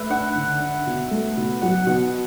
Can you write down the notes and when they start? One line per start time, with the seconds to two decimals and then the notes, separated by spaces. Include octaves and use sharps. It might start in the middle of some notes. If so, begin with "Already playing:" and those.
Already playing: A3 B4 E5
0.10 D4 F#5
0.35 D3
0.60 D4
0.87 B2
1.11 A3
1.37 B2
1.61 F#3 F#5
1.87 B2 F#5